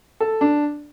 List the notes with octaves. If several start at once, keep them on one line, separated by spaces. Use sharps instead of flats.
A4
D4